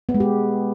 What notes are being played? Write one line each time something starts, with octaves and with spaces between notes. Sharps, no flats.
B3
G#3
G4